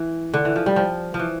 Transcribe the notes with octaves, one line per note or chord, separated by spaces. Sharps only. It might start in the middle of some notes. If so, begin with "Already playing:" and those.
Already playing: E3
D3
E3
F3
G3
F3
F3
E3